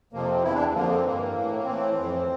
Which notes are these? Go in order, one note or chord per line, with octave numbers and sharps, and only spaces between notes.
F2 C3 F3 A#3
C4
E2 E3 E4
D4
F2 D3 F3 A#3
C4
G2 E3 A#3
A2 E3
A2 E3 C4
F2 E3